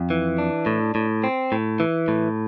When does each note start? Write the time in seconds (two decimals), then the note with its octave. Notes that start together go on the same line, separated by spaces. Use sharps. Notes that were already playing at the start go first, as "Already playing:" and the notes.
Already playing: F2
0.10 E3
0.38 D4
0.66 A2
0.95 A2
1.24 C4
1.52 A2
1.80 E3
2.08 A2